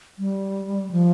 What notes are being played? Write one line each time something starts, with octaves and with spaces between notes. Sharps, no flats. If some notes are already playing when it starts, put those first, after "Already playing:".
G3
F3